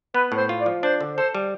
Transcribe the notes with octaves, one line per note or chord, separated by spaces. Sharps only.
B3 B4
A2
C5
F4
D5
F3
D4 C5
D3
A4 C5
G3